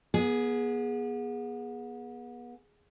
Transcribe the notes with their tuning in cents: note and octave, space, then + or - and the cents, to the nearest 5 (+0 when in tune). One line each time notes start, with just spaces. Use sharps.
B3 -35 G#4 +0